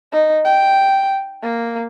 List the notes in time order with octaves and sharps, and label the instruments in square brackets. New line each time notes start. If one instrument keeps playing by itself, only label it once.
[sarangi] D#4
G5
A#3